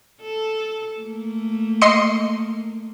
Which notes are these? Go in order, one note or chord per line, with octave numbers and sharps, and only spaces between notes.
A4
A3 A#3
D#5 C6 C#7